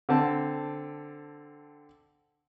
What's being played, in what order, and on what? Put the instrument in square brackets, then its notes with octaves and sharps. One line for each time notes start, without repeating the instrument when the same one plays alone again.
[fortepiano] D3 C4 A5